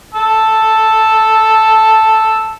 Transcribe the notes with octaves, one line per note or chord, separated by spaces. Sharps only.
A5 E6